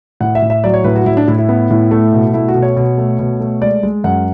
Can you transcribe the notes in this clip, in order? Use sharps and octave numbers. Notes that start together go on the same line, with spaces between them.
A2 F#5
E5
A2
E5
F#3 D5
C#5
A2 B4
F#4
A2 E4
D4
A2 E4
E4
B3
A2
A3
B2
A3 E4
F#4
B2
C#5
B2
A3
B2
A3
G#3 D5
G#3
F#2 F#5